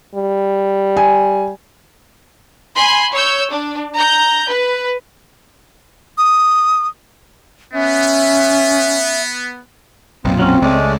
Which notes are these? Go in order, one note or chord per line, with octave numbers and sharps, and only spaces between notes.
G3
G#5
G#5 B5 C6
C#5 E6 G6
D4
A#5 G6
B4
D#6
B3 C#4 E5
B1 F#2 A#2 C4 F4
F#3 C4 C#4
C#2 G#3 A3 C#4 D5